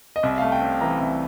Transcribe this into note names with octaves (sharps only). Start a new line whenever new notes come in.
D#5
C2 E5
A3 F5
G5
C3
E3 A#5
C2